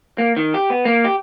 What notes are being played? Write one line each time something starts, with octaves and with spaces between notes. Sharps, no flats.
A#3
D#3
G4
B3
A#3
G4